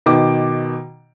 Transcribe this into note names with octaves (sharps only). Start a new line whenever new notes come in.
B2 D#3 D6